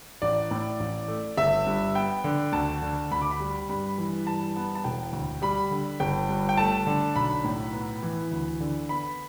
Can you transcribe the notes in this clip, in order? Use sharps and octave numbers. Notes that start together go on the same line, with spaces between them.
A1 D5
A2
A1
A3
G1 E5
G2
B3 G5
D3
D2 A5
D3
D2 B5
D6
B5
G3
G2 B5
E3
G2 A5
B3
A5
E1 G5
D2
G3 B5
D3
G1 G5
G2
G5
A3 A5
D3
B1 B5
A2
B3
E3
D2
D3
B3 B5